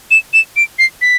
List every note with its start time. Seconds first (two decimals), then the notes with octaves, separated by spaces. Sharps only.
0.11 E7
0.33 E7
0.56 D7
0.79 C7
1.02 B6